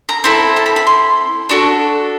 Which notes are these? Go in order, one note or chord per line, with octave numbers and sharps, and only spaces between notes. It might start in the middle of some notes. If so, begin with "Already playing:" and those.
A#5
C4 E4 A4
A5
B5
B5
C6
D4 F#4 A4 C#6